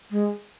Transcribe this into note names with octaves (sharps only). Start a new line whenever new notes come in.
G#3